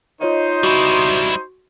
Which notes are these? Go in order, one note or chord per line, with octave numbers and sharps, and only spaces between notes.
D#4 F4 C5 C#5 D#5
G3 E4 F#4 C6 C#6